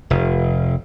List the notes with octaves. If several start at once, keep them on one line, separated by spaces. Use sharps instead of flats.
F1